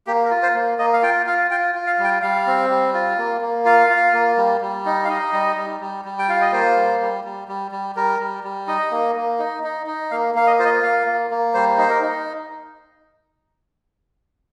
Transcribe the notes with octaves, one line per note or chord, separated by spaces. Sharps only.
A#3 G4
A#4
F4
C5
A#3
A#3 D#5
F5
F4 G5
F4 F5
F4 G5
F4
F5
G3
G5
G3 F5
C4
G3
F4
A#3
A#3
F4 F5
F4
A#3
G3
G3
D#4
F5
D#4 D#5
G3
G3
G3
G3
G5
F4 F5
D#5
A#3 C5
G3
G3
G3
G3
G3
G3 A#4
G3
G3
D#4 D#5
A#3
A#3
D#4
D#4
D#4
A#3 F5
A#3 F5
D#5
F4 C5
D#5
A#3 F5
A#3
A#3
G3 C5
D#4 C5
A#4
D#4